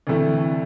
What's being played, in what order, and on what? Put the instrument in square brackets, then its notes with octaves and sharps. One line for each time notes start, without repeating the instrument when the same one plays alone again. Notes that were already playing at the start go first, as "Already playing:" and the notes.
[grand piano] D2 C3 E3 A3 E4